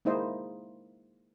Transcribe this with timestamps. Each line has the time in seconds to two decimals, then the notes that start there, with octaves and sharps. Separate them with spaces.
0.05 G#3 A#3 D#4 E4 C5 D#5